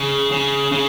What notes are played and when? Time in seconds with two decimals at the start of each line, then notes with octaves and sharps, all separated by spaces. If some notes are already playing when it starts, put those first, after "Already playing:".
Already playing: C#3
0.32 C#3
0.72 C#3